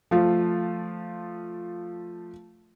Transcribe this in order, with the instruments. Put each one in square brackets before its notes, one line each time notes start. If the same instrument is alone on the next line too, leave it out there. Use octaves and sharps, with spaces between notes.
[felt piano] F3 A3 F4